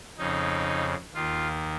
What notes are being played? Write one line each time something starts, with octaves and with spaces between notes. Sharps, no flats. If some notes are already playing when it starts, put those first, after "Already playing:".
F2 C#3 D#4
D#2 D#3 F4